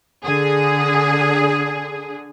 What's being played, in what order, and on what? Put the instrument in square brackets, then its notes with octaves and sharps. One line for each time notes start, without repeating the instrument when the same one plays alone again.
[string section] D3 G#4